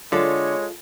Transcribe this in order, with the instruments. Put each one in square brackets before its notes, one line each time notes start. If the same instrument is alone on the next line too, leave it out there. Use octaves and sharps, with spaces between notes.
[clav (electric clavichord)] D3 [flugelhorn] G#3 [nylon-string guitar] F4 A4 [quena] C#5